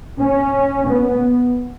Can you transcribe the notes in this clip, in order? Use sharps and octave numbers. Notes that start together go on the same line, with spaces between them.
C#4
B3